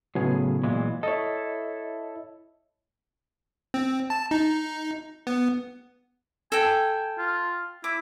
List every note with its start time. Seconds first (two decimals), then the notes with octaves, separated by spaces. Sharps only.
0.15 A2 C#3 F#3 B3 G#4
0.63 A#2 E3 G#3
1.03 E4 A4 C#5 D#5
3.74 C4
4.10 A5
4.31 D#4
5.27 B3
6.52 A4 G5 G#5
7.18 F4
7.84 E4 D6